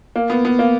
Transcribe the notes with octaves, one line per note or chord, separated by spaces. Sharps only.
A#3
B3
B3
A#3